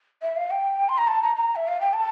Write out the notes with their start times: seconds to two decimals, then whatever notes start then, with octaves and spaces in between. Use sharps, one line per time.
0.22 E5
0.36 F5
0.51 G5
0.89 C6
0.98 A#5
1.08 A5
1.23 A#5
1.36 A#5
1.56 E5
1.68 F5
1.81 G5
1.93 A5